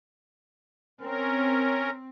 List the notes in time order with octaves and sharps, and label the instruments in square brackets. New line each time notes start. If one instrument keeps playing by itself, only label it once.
[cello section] C4 [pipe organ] C#4 A#4